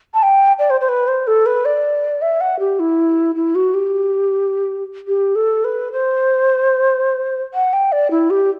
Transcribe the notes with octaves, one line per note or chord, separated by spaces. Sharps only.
A5
G5
D5
C5
C5
B4
C5
A4
B4
D5
E5
F#5
G4
E4
E4
F#4
G4
G4
A4
B4
C5
F#5
G5
D5
E4
G4